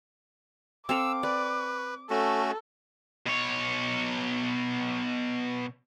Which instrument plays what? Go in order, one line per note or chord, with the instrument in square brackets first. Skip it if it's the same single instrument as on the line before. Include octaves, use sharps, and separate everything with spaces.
[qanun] C4 A4 F5 [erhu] D6 [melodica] E6
[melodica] B4 [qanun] D5
[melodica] A3 C#4 F#4 [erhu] A4
[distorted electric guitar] B2 C#5